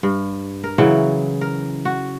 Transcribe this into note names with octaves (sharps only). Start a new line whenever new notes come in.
G2
A#4
C#3 E3 F#3
A#4
F#4